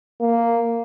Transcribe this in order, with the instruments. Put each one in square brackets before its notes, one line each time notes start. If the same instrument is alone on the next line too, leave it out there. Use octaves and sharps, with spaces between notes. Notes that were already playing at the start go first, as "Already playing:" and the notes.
[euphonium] A#3